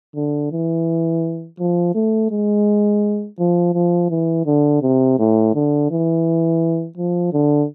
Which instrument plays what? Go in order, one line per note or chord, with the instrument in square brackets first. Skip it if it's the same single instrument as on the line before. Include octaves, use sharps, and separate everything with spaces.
[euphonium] D3
E3
F3
A3
G#3
F3
F3
E3
D3
C3
A2
D3
E3
F3
D3